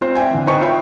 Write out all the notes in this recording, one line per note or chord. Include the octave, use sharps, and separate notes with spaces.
C4 F4 C5
C4 D5 E5 G5 G#5
D3 E3
D#4 B4 C5 G5 A5 C#6
E4 F4 C#5 E5 G5 B5